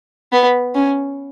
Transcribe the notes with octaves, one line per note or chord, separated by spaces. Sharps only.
B3
C#4